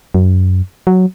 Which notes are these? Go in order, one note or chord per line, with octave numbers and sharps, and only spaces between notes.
F#2
F#3